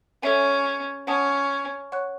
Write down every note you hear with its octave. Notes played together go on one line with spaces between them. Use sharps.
C#4 A4 C#5 E5 G#5
C#4 F#5 A5 D#6
C#5 F#5 C#6 F#6